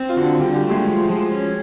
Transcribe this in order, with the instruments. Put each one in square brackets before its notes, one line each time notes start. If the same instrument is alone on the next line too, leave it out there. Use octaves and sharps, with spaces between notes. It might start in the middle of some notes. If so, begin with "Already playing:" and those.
Already playing: [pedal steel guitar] C4
[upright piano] F4
[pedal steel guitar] D3 [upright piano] F#4
[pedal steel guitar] D3 [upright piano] G3 G4
[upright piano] G3 G4
[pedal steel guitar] A3
[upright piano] G#3 G#4
[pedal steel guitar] F3
F3
C#4